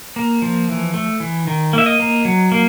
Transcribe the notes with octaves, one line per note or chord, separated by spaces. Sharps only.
A#3
F3
E3
A3
E3
D#3
A#3 E5
D#5
A#3
F#3
A#3